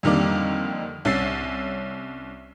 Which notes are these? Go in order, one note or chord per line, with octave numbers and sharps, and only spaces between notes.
F2 D3 D#3 G3 A#3 D6
C2 C#4 E6 A6 C7